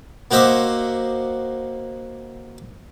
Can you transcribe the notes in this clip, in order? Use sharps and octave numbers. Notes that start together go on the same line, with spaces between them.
A#3 F#4 C5 D#5 E5 D6